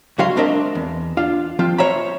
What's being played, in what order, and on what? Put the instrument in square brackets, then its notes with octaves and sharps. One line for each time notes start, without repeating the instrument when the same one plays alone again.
[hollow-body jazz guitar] C#2 F#3 F#4 E5 F5 C6
G#3 C4 D4 A#4 D#5 E5
E2
D4 F4 F5
F3 C4 F4
C5 C#5 E5 A#5 B5